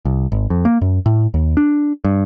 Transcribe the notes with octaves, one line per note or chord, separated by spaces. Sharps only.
C2
G#1
F2
A#3
F#2
A2
D#2
D4
G2